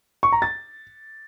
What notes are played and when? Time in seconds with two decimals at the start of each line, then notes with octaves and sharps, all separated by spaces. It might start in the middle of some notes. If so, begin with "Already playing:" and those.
0.23 C#6
0.32 A#5
0.42 A6